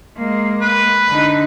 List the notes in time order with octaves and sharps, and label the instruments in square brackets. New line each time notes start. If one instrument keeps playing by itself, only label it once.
[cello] G#3 A#3
[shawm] B4
[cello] D3 D#4